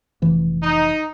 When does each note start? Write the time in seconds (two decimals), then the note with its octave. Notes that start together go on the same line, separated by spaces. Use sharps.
0.22 F1 E3 F3
0.63 D#4